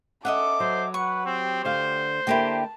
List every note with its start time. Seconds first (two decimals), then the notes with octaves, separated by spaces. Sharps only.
0.25 C#4 A4 D#5 E5 F#5 D6
0.60 F#3 C5
0.94 B4 F#5 C#6
1.26 C4 G4
1.65 D2 D3 C5 F5
2.27 D3 A#3 E4 G4 G5 A5